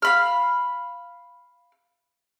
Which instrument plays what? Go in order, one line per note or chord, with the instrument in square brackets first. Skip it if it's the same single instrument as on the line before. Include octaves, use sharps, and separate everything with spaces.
[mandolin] F5 B5 F6